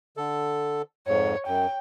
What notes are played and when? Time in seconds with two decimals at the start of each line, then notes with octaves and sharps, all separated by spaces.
0.17 D3 A4
1.08 F2 G#2 C#5
1.47 F#2 G5